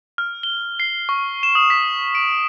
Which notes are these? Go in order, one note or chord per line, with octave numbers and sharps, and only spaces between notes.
F6
G7
C7
C#6
E7
D#6
B6
D7